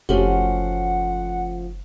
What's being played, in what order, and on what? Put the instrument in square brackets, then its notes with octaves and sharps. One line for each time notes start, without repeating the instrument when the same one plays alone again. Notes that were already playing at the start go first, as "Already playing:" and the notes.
[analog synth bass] F#1 [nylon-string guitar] F3 A3 C#4 [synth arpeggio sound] F#4 G4 [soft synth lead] F#5